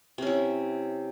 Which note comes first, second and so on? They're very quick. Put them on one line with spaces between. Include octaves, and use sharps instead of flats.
C3 C#4 E4